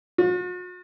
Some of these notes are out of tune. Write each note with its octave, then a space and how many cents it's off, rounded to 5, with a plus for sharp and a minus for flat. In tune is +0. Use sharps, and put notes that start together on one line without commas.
F#4 -45